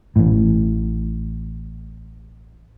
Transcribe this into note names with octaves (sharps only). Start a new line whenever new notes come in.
A1 A2